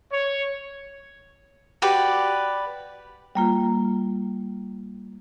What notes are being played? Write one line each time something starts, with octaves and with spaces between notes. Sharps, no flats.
C#5
F#4 G4 B4 D5
G3 A#3 F4